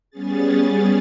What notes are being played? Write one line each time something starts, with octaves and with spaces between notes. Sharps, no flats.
G3 B3 C#4 G#4 A6